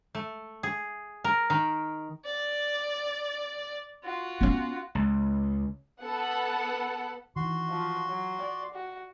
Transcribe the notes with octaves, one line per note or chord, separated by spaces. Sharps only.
A3
G#4
A#4
D#3
D5
F4 F#4
B3 C#4
C#2
B3 A4 F#5
D#3 E3 F#4 C6
F3
F#3
D5
F#4